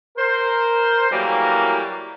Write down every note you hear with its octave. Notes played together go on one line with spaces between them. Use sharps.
A#4 C5
A2 E3 F#3 G3 A#3